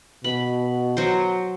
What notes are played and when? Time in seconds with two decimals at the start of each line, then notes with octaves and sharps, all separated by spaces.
0.24 B2 B5
0.97 F#3 C5